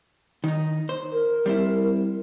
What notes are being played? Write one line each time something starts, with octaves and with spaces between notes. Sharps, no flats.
D#3 D#4
C5
A#4
G3 C4 E4